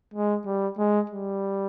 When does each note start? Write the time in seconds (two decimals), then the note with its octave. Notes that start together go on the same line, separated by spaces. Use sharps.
0.14 G#3
0.46 G3
0.78 G#3
1.10 G3